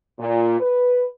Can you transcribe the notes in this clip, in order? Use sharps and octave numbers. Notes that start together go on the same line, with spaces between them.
A#2
B4